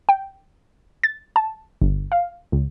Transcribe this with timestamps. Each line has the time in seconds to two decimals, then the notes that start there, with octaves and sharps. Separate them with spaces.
0.09 G5
1.03 A6
1.36 A5
1.82 G1
2.12 F5
2.52 C#2